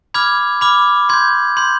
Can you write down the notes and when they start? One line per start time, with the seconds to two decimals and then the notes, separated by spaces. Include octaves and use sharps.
0.14 B5 D6 F6 G#6
0.61 B5 D6 F6
1.09 C6 G6 G#6
1.57 C6 G6